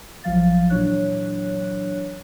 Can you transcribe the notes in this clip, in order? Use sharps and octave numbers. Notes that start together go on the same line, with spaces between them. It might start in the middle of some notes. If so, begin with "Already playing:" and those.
A1 F3 F#3 F5 A6
A#2 E3 F#3 D4 C#5 F#6